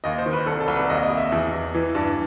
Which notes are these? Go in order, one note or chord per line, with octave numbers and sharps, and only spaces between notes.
D#2 D#5
C5
D#3
B4
C2 A4
A4
C2
B4
D#2 D#5
D#5
D#2
E5
E2
E2
E3
G2